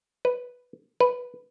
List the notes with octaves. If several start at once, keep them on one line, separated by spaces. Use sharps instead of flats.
B4
B4